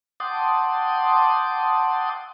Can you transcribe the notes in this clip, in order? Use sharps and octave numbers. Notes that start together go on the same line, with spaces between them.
F#5 G5 A5 C6 D6 D#6